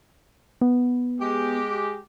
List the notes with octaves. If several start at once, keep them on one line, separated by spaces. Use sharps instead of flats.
B3
G#3 G4